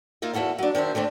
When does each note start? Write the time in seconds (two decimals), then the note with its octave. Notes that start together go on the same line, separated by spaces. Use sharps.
0.22 A#3 D#4 F4 E5
0.34 E2 E4 F#4 A4 F5
0.59 F#3 D4
0.75 D#3 D4 C5 E5
0.95 D3 A3 C4 D4